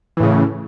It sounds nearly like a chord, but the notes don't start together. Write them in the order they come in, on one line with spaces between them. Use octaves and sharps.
E3 A2 C#3